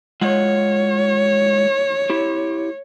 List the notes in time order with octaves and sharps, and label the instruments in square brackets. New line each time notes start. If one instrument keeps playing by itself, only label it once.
[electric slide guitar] G#3 F4 F#5 [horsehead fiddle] C#5
[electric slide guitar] E4 G4